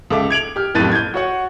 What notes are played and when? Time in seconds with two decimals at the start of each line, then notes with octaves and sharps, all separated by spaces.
0.10 C#2 A4 E5 D6
0.30 G#6 D7 F7 F#7
0.56 G4 F6
0.75 F#1 F2 A2 F#6 A6 D#7
0.92 G6 G#6
1.14 F#4 C#5 F#5